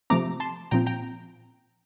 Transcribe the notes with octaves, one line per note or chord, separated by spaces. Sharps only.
C3 F3 A3 C4 A#5 D6
A5 C6
A#2 F3 C4 G5 A#5
G5 A#5